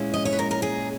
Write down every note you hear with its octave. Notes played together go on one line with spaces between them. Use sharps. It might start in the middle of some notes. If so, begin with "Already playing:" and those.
Already playing: A#2 G#3 C#4 E4
D#5
C#5
B4
A#4
A#4
G#4